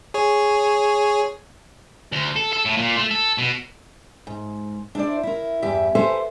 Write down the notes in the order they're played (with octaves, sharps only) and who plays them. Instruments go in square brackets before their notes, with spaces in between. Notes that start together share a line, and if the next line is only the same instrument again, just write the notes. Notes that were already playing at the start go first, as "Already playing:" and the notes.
[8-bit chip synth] G#4 C#5
[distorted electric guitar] D2
A4
A4
A2
A#2
A3
A4
B2
[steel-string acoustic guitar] G#2
D4 E4 C5 D5
E4 A#4
E2 G2 G4 E5
G4 A4 B4 C5 E5 G#5